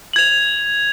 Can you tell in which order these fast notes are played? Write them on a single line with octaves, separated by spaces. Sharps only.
F#7 G#6 F7